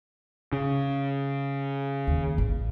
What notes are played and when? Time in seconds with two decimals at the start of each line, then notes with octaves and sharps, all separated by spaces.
0.52 C#3
2.07 D#2
2.38 A1